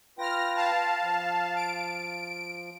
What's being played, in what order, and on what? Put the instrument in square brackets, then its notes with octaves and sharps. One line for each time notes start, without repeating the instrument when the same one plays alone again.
[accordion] F4 B4 G5 [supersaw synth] F6 A#6
[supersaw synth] F5 A5
[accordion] F3
[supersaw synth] D7